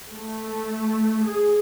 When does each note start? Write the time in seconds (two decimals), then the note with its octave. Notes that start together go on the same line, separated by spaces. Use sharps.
0.11 A3
1.26 G#4